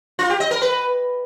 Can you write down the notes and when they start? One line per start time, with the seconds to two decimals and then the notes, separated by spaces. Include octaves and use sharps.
0.19 F4
0.29 G4
0.40 D#5
0.51 A#4
0.62 B4